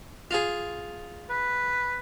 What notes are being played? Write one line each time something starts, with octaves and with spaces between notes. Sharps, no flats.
F4 G#4
B4